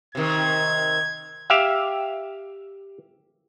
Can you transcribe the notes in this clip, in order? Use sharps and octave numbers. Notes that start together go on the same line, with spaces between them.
C3 D#3 G#6
G4 E5 F5